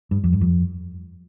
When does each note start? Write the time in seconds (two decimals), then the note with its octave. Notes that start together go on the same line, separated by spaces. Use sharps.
0.11 G2
0.24 F2
0.33 G2
0.41 F2